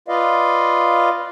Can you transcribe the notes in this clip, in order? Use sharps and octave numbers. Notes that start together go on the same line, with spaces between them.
F4 B4 D5 D#5 F5